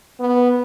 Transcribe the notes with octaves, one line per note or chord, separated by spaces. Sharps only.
B3